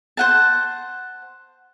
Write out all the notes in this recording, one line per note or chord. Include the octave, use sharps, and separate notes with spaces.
C5 F#5 A5